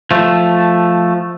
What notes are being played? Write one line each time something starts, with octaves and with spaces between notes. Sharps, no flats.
F3 A3